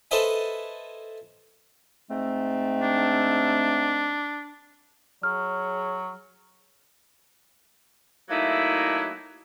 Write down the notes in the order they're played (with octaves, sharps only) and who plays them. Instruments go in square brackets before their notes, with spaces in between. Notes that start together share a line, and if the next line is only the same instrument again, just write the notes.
[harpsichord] A4 B4 C5 D#5 E5 G#5
[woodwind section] G#2 A3 C4
[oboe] D4
[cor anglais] F#3 [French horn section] G#4 C#5 [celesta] F6
[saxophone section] F#3 A3 A#3 D#4 E4